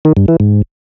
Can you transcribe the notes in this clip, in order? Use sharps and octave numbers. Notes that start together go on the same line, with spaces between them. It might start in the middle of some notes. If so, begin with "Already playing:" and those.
D#3
G2
E3
G#2